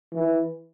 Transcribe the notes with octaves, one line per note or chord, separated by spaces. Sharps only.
E3